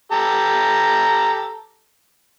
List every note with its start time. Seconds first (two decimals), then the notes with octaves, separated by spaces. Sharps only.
0.12 G4 A4 A#5